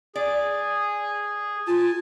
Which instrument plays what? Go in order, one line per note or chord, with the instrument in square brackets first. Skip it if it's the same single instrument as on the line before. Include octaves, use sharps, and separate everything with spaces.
[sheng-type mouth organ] G#4 [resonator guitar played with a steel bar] D5
[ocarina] F4 [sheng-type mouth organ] G#5 A5